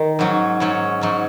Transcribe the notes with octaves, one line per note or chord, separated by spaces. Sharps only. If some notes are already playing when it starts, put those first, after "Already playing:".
Already playing: D#3
G#2 F#3 C#4
G#2 F#3 C#4
G#2 F#3 C#4